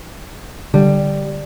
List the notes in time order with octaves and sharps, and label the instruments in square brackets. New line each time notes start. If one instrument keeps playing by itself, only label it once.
[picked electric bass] D3 [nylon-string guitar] G3